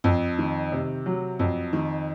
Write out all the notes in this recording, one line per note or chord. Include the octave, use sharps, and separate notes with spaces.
F2
D#3
C3
F#3
F2
D#3